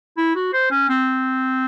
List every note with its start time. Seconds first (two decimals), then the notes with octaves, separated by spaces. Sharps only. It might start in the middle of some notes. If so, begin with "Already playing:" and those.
0.17 E4
0.35 F#4
0.53 C5
0.71 C#4
0.89 C4